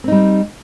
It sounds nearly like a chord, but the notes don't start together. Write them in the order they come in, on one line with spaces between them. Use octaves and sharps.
C4 D#4 G3